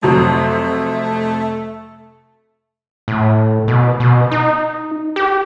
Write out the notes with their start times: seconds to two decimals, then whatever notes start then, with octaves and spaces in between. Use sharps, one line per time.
0.03 F2 C3 F#3 A3
3.08 A2
3.68 B2
4.00 B2
4.31 D#4
5.16 G4